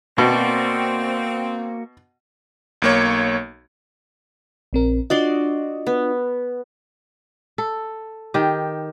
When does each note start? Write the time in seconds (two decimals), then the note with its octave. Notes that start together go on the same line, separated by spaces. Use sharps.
0.18 B2 A#3 C4 F#4 D5
2.82 B1 A#3 C#5
4.73 A#1 C4 A#4
5.10 D4 F4 F#4 D5 D#5 C6
5.87 B3
7.58 A4
8.34 D#3 G4